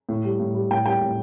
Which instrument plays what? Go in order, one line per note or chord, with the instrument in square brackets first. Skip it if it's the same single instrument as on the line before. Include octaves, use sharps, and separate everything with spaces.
[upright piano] A2
G3
A2
G3
A2 G5
G3 G5
A2